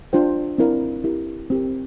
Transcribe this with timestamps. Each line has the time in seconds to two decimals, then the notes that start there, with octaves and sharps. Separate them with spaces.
0.13 D4 F4 C5 G5
0.58 C4 E4 A#4 D5 F5
1.04 E4 G4 A#4
1.50 C4 G4 A#4